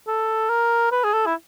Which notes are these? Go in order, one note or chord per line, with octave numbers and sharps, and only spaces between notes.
A4
A#4
B4
G#4
A4
E4